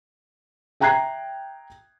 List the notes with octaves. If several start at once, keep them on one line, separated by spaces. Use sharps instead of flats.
E5 G5 A#5 F#6 G#6 C7